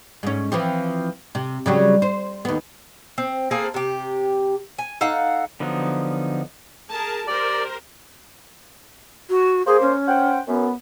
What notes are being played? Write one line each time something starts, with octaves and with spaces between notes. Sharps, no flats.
G#2 C#4
E3 F3 C4
C3
C#3 F#3 G3
C5
D#2 B3
C4
A#3 C4 G#4 A4
C3 G4
G#5
D#4 A4 F5 F#5
D3 F3 F#3 B3 D#4
G#4 A#4 A5
G4 A#4 C5 D5
F#4
A#3 G#4 C5
C#4
C5 F#5 G5
F#2 B3